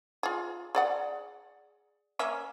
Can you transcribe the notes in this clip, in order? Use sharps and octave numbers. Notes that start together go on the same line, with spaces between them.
F4 G#4
G#4 D5 F#5
A#3 C#4 E5